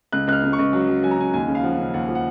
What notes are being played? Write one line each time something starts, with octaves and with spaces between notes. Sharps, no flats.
C#2 F#6
C#2 F#6
F6
C#2
C#6
C#2
F#3
F#3
F#3 G#5
A#5
C#2 G#5
D#2 G#5
C#3
F5
F3 F#5
C#3
D#2 F#5
F3
F#5